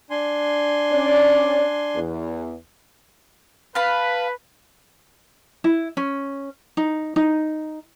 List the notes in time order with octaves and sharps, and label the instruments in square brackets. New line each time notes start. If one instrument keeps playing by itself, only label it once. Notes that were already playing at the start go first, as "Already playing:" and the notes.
[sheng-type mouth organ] D4 G#5 C6
[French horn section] C#4 D5
E2
[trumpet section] B4 [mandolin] F5 A5 B5
[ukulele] E4
C#4
D#4
D#4